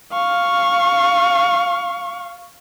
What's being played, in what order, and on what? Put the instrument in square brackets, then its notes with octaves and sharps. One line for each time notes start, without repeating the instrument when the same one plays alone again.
[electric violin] F5 C#6